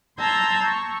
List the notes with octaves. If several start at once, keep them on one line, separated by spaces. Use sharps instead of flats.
A5 A#5 C6 E6 G6 G#6
C#6